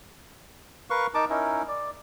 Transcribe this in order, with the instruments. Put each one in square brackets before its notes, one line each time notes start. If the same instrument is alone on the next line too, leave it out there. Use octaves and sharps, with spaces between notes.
[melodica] A#4 B4 F5 C#6
D#4 A#4 A5 D6
C#4 D#4 E4 A#4
D5